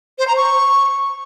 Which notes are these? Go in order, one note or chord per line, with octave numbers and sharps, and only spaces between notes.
C5
A#5
C#6